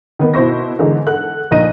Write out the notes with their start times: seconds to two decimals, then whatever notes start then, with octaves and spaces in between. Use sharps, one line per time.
0.19 D#3 B3
0.34 B2 E4 C5 C#6 A#6
0.79 D3 E3 G#3 D#4
1.07 A4 F#5 F#6
1.51 A#1 A#2 D#4 A#6 D#7